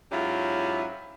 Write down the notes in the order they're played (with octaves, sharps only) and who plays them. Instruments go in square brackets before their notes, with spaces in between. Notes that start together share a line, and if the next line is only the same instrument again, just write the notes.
[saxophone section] G#2 F#3 C#4 E4 F4 G4